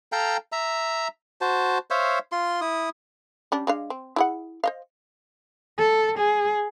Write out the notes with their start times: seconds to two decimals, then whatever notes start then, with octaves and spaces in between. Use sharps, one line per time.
0.12 A4 F5 G5 A#5
0.52 E5 A#5
1.41 F#4 C5 A5
1.90 C5 C#5 E5 F5
2.32 F4 C6
2.61 E4 D#6
3.52 G3 C#4 D4
3.67 G#3 D4 F5
3.90 C4
4.16 E4 G#4 F#5
4.64 C5 D#5 F5
5.78 A4
6.18 G#4